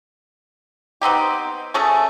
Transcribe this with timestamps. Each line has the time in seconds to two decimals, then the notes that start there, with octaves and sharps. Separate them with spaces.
1.01 B3 C4 D#4 G4
1.74 A3 C#4 G#4 A4